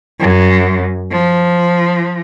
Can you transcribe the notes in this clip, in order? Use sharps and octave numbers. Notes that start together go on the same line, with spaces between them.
F#2
F3